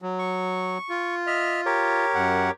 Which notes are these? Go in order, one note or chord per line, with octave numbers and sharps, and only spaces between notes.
F#3
C#6
F4
D#5 E5 F6
G4 A#4 C#5
F#2 F#5